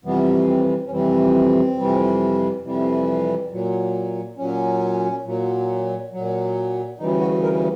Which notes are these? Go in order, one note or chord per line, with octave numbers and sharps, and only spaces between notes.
F2 C3 E3 G3 B3
C4
C#4
F2 C3 E3 G3 C4
F2 C3 E3 G3
F2 C3 E3 G3
A#2 F#3
A#2 F#3 C#4
A#2 F#3
A#2 F#3
D2 C#3 E3 G3 D#4
F#4
A#4